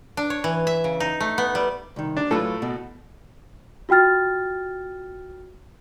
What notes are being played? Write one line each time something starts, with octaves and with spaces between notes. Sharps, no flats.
D4
C#5
E3
E5
C#3
D#4
A3
B3
G3
C2 D#3
D4
A2 F#3 F4 A4 B4
B2
F4 F#4 G5 F6 A6